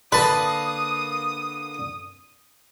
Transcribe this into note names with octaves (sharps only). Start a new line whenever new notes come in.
D3 A#3 B4 A5 B5 D#6